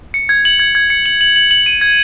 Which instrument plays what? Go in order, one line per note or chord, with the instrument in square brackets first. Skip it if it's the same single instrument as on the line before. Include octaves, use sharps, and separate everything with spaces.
[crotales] C#7
G#6
F#7
G#6
G#6
C#7
F#7
F#7
F#7
F#7
D#7
G#6